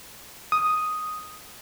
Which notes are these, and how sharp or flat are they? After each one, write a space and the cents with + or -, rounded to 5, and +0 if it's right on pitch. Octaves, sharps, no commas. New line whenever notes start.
D#6 +0